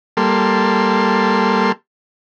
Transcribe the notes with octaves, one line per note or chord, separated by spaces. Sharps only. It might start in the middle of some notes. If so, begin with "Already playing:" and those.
G3 A#3 A4 C6